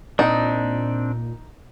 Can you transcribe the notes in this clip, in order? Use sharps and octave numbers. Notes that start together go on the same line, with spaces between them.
A#2 C4 D4 D#4